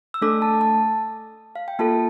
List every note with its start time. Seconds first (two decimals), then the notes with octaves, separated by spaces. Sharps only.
0.14 E6
0.22 A3 D4 A4 D6
0.42 A5
0.61 A5
1.56 F5
1.68 G5
1.79 A#3 F4 A4 A5